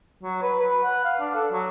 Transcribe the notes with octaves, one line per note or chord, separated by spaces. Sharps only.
F#3
B4
B4
F#5
F5
D4
A4
F#3